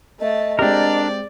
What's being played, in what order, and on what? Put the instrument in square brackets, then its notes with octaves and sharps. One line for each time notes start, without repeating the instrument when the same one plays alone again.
[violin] A3 A5 [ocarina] D#5
[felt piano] G#3 C4 G4 [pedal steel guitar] D4 A#4 [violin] D5